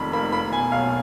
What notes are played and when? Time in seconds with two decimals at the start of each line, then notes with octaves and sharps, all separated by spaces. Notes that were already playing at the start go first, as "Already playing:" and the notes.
Already playing: F1 F2 D#3 B5
0.13 A#3 B5
0.32 A#3 B5
0.52 B2 G#5
0.72 B1 F5